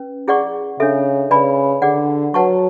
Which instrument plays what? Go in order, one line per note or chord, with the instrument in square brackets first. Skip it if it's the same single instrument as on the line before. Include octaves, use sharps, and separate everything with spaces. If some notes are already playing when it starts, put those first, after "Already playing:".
Already playing: [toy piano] C#4 B4
E4 G#4 D5 F#5 C#6
[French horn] C#3 [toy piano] D4 A4 E5
[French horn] C#3 [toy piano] B4 D5 G#5 B5
[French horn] D3 [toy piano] G#4 D5 F#5
[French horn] F#3 [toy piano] B4 F#5 A5 C#6